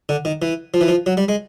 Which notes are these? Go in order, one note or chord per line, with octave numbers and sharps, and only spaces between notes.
D3
D#3
E3
F3
E3
F3
F#3
G3
G#3